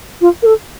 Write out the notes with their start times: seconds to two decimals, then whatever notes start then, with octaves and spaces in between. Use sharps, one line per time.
0.21 F4
0.42 A#4
0.46 A4